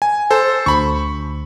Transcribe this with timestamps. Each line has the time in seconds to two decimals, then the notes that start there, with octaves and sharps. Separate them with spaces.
0.02 G#5
0.30 A4 C5
0.66 D2 B5 C#6